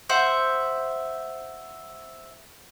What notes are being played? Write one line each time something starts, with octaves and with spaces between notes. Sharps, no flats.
C5 E5 F#5